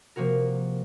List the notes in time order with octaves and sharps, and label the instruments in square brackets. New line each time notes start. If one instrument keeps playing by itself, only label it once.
[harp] C3 F3 A#3 F#4 A#4